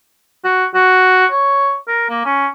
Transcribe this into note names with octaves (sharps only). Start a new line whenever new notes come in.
F#4
F#4
C#5
A#4
A#3
C#4